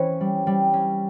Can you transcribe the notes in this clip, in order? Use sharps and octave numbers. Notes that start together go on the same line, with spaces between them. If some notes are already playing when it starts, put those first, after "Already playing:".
Already playing: E3 C4 C#4 C#5
G3
G3
C#4